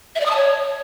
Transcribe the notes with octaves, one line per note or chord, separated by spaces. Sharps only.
E5
D5
D#6
A5
C#5